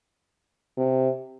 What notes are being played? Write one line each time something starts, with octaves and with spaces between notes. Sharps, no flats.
C3